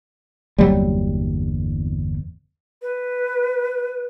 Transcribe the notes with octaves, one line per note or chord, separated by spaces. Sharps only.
G1 E2 F#3 G3 A#3
B4